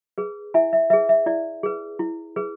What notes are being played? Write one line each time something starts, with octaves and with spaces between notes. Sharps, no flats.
G#4 B4
E4 E5 G#5
E5
G#4 B4 E5
E5
E4 D5
G#4 B4
E4
G#4 B4